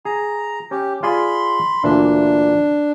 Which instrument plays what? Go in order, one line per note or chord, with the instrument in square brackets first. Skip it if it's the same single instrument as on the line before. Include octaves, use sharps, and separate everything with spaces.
[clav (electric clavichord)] G#4 [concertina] A#5
[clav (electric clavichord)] C#4 [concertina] G4
[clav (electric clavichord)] F4 G#4 D5 [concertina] B5 C6
[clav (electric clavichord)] D2 A#2 E3 [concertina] D4